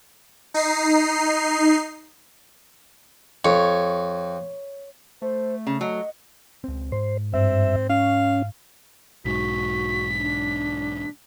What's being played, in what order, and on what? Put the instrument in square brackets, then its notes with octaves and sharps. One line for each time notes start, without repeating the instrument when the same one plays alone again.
[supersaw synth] D#4 C7
[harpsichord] F2 [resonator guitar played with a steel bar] C#5
[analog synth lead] A3 [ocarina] C5
[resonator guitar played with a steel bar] C#3 [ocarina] C#4
[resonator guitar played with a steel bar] F#3 [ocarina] D#5
[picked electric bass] C#2 C4
[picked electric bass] G#2 [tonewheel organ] C5
[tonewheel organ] G2 E5 [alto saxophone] C4
[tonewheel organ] C#4 [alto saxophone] F5
[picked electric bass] B1 G#2 [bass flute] F#4 [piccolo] B6
[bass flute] D4